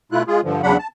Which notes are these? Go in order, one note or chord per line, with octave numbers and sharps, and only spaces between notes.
B2 A3 E4 F4 F#6
G#3 F4 G#4
G2 D3 F3
E2 C#3 F#3 D4 F#5 B5
A5